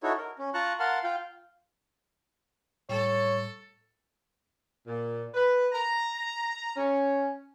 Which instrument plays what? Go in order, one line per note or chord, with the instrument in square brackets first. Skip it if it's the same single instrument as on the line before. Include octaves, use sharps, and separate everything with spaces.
[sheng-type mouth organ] D#4 E4 F#4 A4 C#5
A#4
C#4
F4 A5 A#5 C#6 F#6
A#4 F5 F#5 A5 C6
F4 F5 G5
[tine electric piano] A2 G3 [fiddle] A4 [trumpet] C#5
[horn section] A#2
B4
A#5
C#4